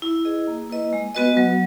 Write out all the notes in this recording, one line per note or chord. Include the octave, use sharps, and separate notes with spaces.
E4
G#4 B4 D#5
A#3
E4 B4 D#5
G#3
B3 F#4 B4 D#5
F#3